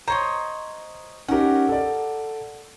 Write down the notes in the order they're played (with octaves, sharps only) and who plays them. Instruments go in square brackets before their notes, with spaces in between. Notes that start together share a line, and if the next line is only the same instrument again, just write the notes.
[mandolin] C5 C#5 D#5 [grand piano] A#5 C6
[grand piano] C#4 D#4 G4 [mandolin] A#4 F#5
[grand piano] A4 D5